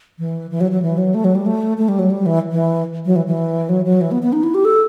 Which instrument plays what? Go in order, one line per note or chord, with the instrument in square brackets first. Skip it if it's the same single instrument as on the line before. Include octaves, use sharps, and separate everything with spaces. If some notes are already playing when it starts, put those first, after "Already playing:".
[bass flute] E3
E3
F#3
F#3
E3
F#3
A3
F#3
G3
A3
A3
G3
F#3
G3
E3
E3
F#3
E3
E3
F#3
F#3
E3
B3
B3
D#4
E4
G4
A4